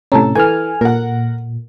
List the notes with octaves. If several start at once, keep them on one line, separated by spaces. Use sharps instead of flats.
A2 C3 C#4 A4 A5 A#5
E3 A4 G#5 F6
A#2 A#4 F#5